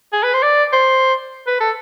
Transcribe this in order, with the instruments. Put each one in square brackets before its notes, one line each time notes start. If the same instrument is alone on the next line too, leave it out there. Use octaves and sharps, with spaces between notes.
[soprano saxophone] G#4
B4
C5
D5
C5
B4
A4